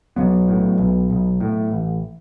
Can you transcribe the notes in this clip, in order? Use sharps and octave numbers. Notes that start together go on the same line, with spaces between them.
B1 F#3 B3
A2
B1
B1
A2
A1